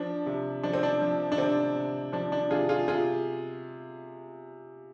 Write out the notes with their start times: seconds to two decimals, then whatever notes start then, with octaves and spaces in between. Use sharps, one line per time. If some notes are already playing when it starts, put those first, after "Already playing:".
Already playing: F3 D4
0.26 C3
0.63 F3 D4
0.73 C4
0.83 D4
1.01 F3
1.32 D4
1.38 C3 C4
1.75 C3
2.13 F3 D4
2.32 D4
2.50 C3 F4 G#4
2.69 F4 G#4
2.88 C3 F4 G#4